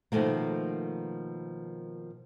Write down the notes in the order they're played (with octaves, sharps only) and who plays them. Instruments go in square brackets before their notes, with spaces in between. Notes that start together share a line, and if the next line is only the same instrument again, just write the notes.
[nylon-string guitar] B2 D#3 F3 A3 A#3